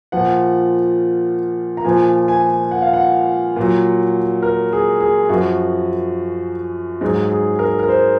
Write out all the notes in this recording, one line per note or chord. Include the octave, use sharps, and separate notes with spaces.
A#2 F3 F#5
A#5
A#2 F3 G#5
G#5
F#5
F5
F#5
A#2 F#3
A#4
G#4
G#4
F#2 F3 F#4
G#2 F#3 G#4
G#4
A#4
A#4
C5